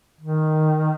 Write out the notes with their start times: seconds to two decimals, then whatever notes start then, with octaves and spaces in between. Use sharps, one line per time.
0.21 D#3